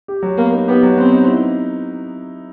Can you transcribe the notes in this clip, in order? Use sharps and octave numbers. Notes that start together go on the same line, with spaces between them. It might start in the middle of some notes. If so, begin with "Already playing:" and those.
G4
F#3
A#3 B3
D#4
B3 G4
F#3
B3 C4
D#4
E4